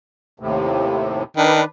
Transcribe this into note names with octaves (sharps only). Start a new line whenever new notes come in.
D#2 A2 C3
D#3 D4 B4